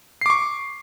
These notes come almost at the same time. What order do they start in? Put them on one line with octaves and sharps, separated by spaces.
C7 D6 C#6